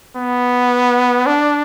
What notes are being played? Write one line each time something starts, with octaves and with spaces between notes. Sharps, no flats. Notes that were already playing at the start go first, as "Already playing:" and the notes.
B3
D4